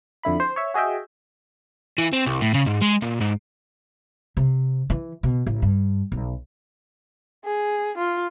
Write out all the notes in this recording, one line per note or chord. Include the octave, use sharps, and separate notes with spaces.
F2 D3 E4 B5
C5
C#5 E5
F#4 G#4 D#5 E5 G5
E3
C4
C2
A2
C#3
G#2
G#3
A#2
G#2
C3
E3
B2
A1
G2
B1
G#4
F4